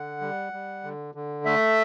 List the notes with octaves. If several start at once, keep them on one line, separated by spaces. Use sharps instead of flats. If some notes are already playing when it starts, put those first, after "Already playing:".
Already playing: D3 F#5
G3
G3
D3
D3
A3 E5